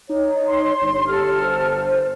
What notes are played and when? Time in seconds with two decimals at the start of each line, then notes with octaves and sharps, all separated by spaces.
0.09 D#4 C#5
0.49 C6
0.81 G1
1.08 G4 A4 F6
1.42 C5